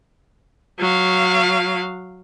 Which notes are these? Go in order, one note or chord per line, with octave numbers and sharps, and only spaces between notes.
F#3 F5